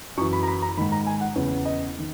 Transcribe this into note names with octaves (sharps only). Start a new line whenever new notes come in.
F#2 E3 C#6
B5
A#5
B5
A#5
G#2 D#3 B5
A#5
G#5
F#5
E2 C#3 E3
D#5
D#3